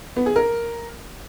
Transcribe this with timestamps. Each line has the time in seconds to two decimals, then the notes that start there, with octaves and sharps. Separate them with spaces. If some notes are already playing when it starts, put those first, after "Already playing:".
0.16 B3
0.26 G#4
0.36 A#4